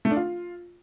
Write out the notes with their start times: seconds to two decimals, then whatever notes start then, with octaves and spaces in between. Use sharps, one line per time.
0.05 A3
0.11 D4
0.16 F4